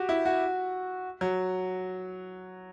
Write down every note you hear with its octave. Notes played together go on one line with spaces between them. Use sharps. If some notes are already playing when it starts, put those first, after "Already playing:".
Already playing: F#4 G4
E4
F#4
F#3